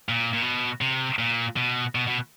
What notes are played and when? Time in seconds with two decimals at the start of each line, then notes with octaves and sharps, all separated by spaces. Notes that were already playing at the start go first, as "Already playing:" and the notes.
0.09 A#2
0.33 A#2
0.42 B2
0.81 C3
1.19 A#2
1.56 B2
1.95 B2
2.07 B2